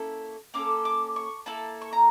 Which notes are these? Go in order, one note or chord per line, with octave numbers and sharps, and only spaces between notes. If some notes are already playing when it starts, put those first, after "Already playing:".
Already playing: A#3 C#4 E4 A4
A#3 C#4 A4 D6
D6
C#6
A#3 E4 A4 A5
C#6
A#5